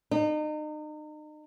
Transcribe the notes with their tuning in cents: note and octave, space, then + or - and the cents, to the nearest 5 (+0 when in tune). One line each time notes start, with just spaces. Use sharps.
D#4 -35